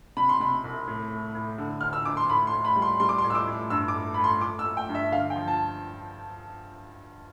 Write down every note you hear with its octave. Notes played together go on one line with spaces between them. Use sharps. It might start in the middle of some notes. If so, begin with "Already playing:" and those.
C3 B5
C6
C3 B5
C2
A2
A3
A2
D3
D2 F6
E6
D2 D6
C6
A2 B5
C6
A2
B5
G3
C6
G3 C6
D6
C6
A2
E6
D6
A2
G2 E6
D6
A3
A3 B5
C6
A3 D6
E6
A3
G5
G2
E5
D3 F5
G5
F3
A5